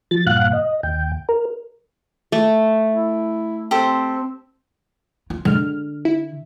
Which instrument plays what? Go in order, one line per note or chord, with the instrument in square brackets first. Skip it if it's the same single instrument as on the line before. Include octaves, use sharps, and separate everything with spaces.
[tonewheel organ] F3 A6
G2 A#2 F5 F#5 F#6
D#5
D#2 G5
A#4
[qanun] A3
[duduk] E4
[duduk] C4 [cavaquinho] G4 A4 C5
[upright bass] F4
[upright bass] D3 [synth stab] G#3 F6
[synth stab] E4